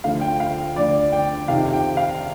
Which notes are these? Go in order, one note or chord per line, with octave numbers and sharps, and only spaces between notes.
D2 D3 F3 F5
G5
F5
D2 D3 F3 D5
G5
F2 C3 D#3 F5
G5
F5